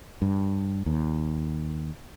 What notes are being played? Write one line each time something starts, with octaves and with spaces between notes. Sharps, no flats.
G2
D#2